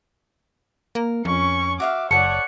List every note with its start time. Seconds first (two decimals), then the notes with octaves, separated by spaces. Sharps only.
0.95 A#3 A#4
1.25 F2 C#4 C#6
1.80 F#4 E5 F5 D6
2.11 F#1 A4 C#5 D5 F#5 C#7